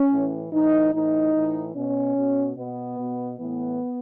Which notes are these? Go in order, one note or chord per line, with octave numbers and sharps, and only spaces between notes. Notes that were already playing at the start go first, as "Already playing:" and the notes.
Already playing: C#4
A2 E3
A2 E3 D#4
A2 E3 D#4
A2 E3
B2 C#4
B2
B2 B3
B2
A2 E3 B3